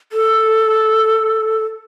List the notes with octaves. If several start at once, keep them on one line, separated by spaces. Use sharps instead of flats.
A4